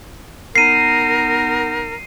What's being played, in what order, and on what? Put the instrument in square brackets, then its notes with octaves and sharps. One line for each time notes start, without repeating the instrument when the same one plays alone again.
[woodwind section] B3 D#4 A#4 [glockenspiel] C7 D#7